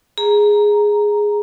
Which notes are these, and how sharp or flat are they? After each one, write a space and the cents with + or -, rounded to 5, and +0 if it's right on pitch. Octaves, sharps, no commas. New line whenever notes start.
G#4 +0 A#5 +0